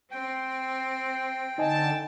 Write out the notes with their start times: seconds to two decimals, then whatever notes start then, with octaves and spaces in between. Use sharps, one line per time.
0.11 C4 G5
1.58 D3 D#4 D#5 G#5 A5